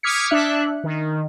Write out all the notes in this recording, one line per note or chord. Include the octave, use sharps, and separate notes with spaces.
D6 D#6 F6 G#6 B6 C#7
D4 E5 F#6
D#3